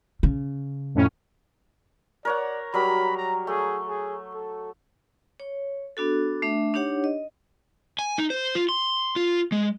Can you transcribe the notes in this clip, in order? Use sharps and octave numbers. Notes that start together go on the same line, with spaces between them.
C#3
F2 A2 C#4
A#4 C#5 D5 F#5
F#3 G3 A#4 B5
A#5
A3 G#4
G#4
A4
C#5
B3 D4 F#4 A4
A3 D4 E5
D4 D#4 G4 C#5 F#5
D#5
G#5
D#4
C5
F4
C6
F4
G#3